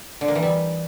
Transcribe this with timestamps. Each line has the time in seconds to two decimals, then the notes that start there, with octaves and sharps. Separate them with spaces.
0.21 D3
0.28 A#3
0.35 E3
0.43 G3